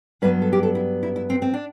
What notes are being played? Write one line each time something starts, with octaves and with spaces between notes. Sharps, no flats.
G2 F#3 B3 B4
A4
G4
A4
E4
E4
E4
C4
C4
D4